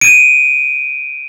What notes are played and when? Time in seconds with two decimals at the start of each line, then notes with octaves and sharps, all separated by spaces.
0.01 D7 D#7